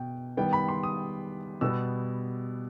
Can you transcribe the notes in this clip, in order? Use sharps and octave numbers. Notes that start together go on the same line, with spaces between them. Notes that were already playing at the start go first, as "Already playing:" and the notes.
Already playing: B2 G5
D#3 G3 B3 G5
B5
C6
D#6
B2 G3 B3 E6